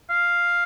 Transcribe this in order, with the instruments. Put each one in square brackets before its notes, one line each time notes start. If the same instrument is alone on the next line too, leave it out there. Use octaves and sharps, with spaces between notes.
[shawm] F5